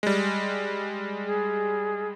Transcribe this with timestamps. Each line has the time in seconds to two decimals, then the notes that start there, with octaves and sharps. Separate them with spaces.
0.03 G3 G#3
1.25 G#4